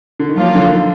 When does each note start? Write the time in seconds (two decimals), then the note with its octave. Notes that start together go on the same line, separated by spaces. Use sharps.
0.20 D3
0.29 D#3
0.36 F3 F#3 A#3 F4
0.55 D3
0.72 D#3